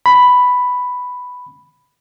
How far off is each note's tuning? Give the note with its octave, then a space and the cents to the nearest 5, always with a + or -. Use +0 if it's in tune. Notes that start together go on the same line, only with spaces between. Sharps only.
B5 +5